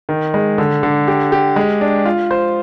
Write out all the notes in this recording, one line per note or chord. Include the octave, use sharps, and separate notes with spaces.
D#3
G#3
D3
D3
G4
G4
G#3
D4
F4
C5